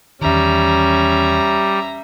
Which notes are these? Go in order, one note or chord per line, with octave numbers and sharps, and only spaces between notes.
E2 D#3 G3 C#4 E5 A#5